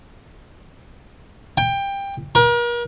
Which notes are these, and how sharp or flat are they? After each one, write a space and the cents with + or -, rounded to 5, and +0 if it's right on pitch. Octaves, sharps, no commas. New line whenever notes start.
G5 +20
A#4 +40